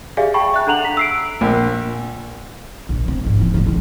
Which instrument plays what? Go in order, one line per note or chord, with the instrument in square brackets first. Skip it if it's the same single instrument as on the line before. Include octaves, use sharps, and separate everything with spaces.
[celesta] G4 G#4 D5 E5 F5 G#5
G5 A5 B5 C#6
E5 F#6
D4 A4 F#5 A#5 F7 F#7
B6
E6 C7 D7
[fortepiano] A#1
[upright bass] A#1
C4
G#2 B3
E3 C4
A2 C#4
A#1 E2